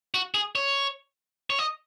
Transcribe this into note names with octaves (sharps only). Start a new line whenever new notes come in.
F#4
G#4
C#5
C#5
D#5